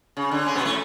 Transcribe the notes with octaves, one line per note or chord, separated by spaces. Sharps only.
C#3
D3
C#3 C#4
B2 B3
A2 A3